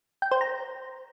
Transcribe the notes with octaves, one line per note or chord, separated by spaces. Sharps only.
G5
C5
A#5